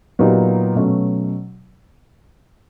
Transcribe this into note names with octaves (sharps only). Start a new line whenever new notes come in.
A#2 F#3 B3 D#4 G4
B2 F#3 A3 C#4